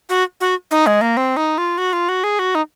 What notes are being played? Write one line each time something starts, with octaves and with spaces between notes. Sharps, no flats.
F#4
F#4
D#4
G#3
A#3
C4
D#4
F4
F#4
F4
F#4
G#4
F#4
D#4